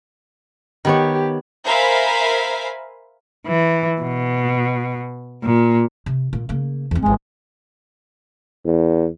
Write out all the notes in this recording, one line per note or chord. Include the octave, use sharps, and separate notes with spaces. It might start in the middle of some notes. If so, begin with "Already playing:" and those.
D#3 B3 G4 C#5
A#4 C5 E5 F5 G#5 B5
E3
B2
A#2
C3
A#2 A#3
C#3 A#3
E2 C4
D1 G#1 G#3
E2